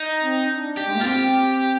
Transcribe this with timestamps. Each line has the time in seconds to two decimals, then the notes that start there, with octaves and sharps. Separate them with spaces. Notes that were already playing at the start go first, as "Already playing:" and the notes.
Already playing: D#4
0.22 C4
0.50 D4
0.77 G4
0.87 G#3
0.96 A#3
1.01 F4
1.05 C4 G4